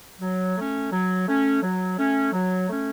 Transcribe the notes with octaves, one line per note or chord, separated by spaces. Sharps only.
F#3
A3 C#4
F#3
A3 C#4
F#3
A3 C#4
F#3
A3 C#4